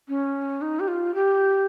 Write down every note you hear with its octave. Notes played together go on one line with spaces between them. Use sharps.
C#4
D#4
G4
F4
G4